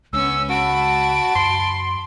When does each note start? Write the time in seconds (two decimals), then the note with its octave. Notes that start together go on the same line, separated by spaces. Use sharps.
0.13 C#2 G#3 B3 C#4 D4 E6
0.50 F#4 A5 B5 D7
1.35 F#2 C6